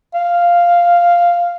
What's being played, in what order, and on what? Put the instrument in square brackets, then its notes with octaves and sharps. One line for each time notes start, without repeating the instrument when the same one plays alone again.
[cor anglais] F5